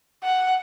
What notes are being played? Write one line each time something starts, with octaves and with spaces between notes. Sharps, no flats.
F#5